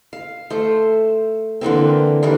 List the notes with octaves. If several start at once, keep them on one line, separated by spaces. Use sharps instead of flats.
F5
A3 C5
D3 E3 A#3 C4
E3 G3 A#3 D4